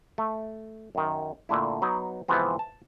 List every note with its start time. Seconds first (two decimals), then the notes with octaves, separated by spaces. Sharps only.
0.18 A3
0.95 F#2 D#3
1.49 A#2 D3 A3 E4
1.82 F#3 B3 D#4
2.28 G#2 C3 E3 F3 B3 C4
2.59 A5